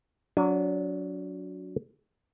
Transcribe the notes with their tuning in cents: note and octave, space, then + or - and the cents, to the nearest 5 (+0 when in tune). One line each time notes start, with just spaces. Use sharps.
F#3 -10 D4 -35 G#5 +20